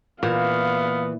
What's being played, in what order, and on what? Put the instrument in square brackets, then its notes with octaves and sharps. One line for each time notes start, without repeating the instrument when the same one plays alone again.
[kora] A#2 [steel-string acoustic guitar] E3 [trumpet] B3 [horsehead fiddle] F5